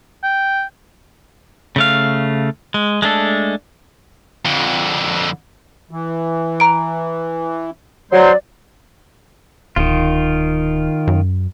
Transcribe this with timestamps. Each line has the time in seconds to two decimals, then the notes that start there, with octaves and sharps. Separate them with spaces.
0.23 G5
1.76 C#3 A3 F5
2.74 G#3
3.02 G#3 A3 D4 A4
4.45 F2 D3
5.91 E3
6.60 A#5 D7
8.12 F#3 C5 D5 C6
9.76 D1 D#3 F4
11.08 F#2